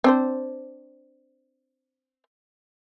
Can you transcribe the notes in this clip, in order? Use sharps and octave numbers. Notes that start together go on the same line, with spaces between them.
C4 D4 C5